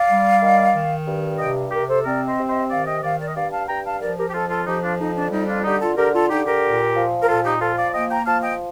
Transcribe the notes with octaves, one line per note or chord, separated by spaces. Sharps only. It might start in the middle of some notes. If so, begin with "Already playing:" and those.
Already playing: D5 F5
G3
D#3
D#3
G2
C3 D#5 G5
C3 G4 A#4
A4 C5
C4 A#4 D5
C5 D#5
C3
C5 D#5
D#3 D5 F5
D#5 G5
D#3 D5 F5
A#4 D5
D#5
G2 D5 F5
F5 A5
G2 G5 A#5
F5 A5
F3 A#4 D5
G4 A#4
G4
F2 F4 A4
F4 A4
F3 D#4 G4
D4 F4
F2 D#4
D4
G3 D#4
D4 F4
D3 D#4 G4
F4 A4
D3 G4 A#4
F4 A4
D3 D#4 G4
G4 A#4
A#2
F3
A#4
A#2 F4 A4
D#4 G4
F3 F4 A4
D5 F5
A#3 D#5 G5
G5 A#5
F3 F5 A5
D#5 G5